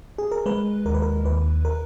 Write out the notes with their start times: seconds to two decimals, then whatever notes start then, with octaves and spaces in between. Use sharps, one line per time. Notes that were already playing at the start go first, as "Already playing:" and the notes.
0.18 G#4
0.32 A#4
0.46 G#3 B4
0.85 D#2 A#4
0.94 B4
1.02 A#4
1.24 D#2 B4
1.65 A#4